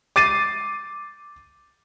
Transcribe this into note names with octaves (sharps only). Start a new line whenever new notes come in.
D6 A6 C7 D#7